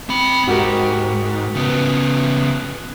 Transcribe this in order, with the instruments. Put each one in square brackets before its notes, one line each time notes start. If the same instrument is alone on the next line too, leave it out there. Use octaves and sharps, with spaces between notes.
[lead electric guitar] C4 B5
[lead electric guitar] G#2 [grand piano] F#4 G4 A#4
[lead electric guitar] C#3 B3